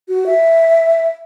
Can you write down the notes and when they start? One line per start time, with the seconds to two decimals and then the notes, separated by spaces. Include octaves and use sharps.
0.09 F#4
0.26 E5